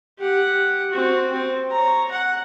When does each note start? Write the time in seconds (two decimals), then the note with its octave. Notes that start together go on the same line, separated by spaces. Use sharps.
0.19 G4 F#5
0.91 C4 F#4
1.32 C4
1.72 C#5 A#5
2.11 F#5